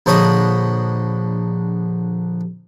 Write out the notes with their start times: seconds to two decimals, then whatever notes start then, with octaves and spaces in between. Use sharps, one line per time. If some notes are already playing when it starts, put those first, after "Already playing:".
0.06 A#1 D3 C5 C#5 D#5 B5